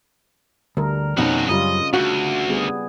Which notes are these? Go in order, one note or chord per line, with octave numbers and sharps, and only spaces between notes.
D2 G3 A#4
F2 B2 F3 C4 C#4 D#4 F#4
F#2 C#3 G3 F4 D#5
D2 F#4
G3 B3 G#4